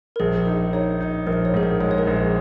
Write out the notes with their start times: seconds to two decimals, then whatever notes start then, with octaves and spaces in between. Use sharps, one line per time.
0.16 A#4
0.20 A#1 G#4
0.37 A#4
0.47 D#4
0.73 D#4 C#5
1.01 D#4
1.27 A#1 A#4
1.45 C#5
1.54 G#2 G#4
1.63 A#4
1.80 G#3 C#5
1.91 C#5
1.98 A#4
2.07 A#1
2.17 G#4